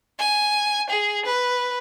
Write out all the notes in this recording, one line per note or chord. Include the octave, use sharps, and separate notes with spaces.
G#5
G#4
B4